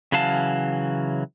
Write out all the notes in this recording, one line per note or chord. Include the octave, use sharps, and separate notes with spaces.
C#3 E3 F#3 F5 A5